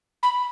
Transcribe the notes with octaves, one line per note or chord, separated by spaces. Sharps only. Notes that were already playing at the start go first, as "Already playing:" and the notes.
B5